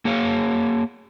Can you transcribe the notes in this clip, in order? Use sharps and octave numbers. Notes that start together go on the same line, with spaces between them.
A#3 G#4 C#5 F5